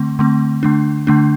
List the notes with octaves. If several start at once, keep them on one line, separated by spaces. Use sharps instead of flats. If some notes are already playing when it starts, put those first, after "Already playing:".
Already playing: D3 A3 C4
D3 A3 C4
D3 A3 D4
D3 A3 D4